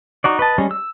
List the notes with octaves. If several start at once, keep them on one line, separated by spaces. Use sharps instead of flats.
D#4 F#4 D5
B4 D#5 A5
G3 G#3 C#4
E6